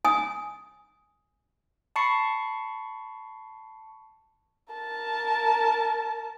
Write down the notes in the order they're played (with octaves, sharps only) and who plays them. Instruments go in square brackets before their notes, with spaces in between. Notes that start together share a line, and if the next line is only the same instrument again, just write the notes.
[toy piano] G#5 D#6
[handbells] A5 B5 C#6 C7 C#7
[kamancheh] A#4 A5